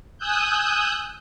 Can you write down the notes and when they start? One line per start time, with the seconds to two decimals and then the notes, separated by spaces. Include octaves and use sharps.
0.18 G#5 D#6 E6 F#6 G6